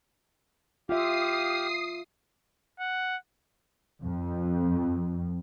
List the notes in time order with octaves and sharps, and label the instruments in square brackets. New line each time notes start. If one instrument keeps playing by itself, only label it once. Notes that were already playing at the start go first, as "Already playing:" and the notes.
[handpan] F4 E5 [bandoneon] G4 F5 [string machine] D#6 C7
[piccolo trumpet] F#5
[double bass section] F2